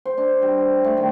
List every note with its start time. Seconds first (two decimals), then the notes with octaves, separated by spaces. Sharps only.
0.05 C5
0.18 D4
0.42 G3
0.58 C5
0.84 A3
0.97 D#3